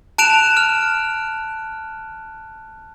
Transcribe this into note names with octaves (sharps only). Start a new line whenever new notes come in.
A5 F#6 D7 E7 F7
F6